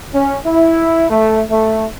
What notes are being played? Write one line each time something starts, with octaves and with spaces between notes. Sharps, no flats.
C#4
E4
A3
A3